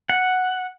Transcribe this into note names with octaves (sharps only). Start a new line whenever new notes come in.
F#5